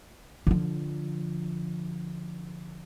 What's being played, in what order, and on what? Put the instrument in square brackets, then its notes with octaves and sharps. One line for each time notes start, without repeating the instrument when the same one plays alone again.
[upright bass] D3 F3